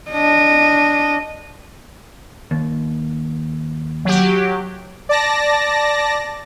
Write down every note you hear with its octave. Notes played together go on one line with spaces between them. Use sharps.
D4 D#5
D#2
F#3 G4
D5 A5 A#6